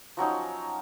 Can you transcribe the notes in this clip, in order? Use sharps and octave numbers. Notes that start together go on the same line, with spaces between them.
F3 F#3 C#4 D#4